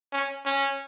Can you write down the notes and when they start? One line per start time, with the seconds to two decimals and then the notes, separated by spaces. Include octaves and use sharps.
0.12 C#4
0.46 C#4